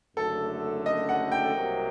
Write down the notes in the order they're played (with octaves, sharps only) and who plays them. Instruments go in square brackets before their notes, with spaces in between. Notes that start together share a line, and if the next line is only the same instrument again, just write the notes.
[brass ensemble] F#1 F#2 D3 A3 [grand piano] A4
[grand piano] D#5
F#5
G5
[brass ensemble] C2 C3 F#3 A#3